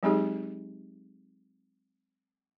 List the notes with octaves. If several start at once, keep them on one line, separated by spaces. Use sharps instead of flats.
F#3 G#3 C4 D#4 G4 G#4